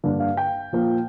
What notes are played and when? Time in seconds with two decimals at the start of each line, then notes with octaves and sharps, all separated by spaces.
0.04 G2 D3 A#3 D4
0.20 F5
0.37 G5
0.73 A#2 F3 A#3